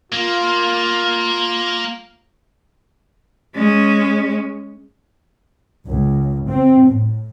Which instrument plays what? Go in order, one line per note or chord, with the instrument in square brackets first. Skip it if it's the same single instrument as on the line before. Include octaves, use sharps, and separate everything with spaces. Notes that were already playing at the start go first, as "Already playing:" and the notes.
[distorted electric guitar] A#3 [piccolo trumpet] F4
[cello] G#3 C#4
[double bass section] C#2
C4
A2